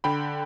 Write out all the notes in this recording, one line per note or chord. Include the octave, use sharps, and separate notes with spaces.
D3 G5 B5